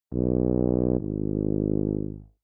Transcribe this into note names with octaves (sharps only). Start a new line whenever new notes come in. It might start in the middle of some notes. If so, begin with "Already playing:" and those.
B1
G#1